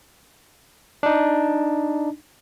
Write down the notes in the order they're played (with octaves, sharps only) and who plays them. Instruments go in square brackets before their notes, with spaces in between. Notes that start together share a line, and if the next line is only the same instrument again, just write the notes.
[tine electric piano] D4 D#4